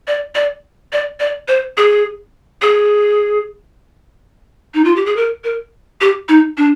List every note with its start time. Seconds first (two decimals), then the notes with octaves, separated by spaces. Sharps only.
0.07 D5
0.35 D5
0.93 D5
1.20 D5
1.48 C5
1.77 G#4
2.62 G#4
4.74 D#4
4.85 F4
4.96 G4
5.06 G#4
5.16 A#4
5.44 A#4
6.01 G4
6.29 D#4
6.57 D4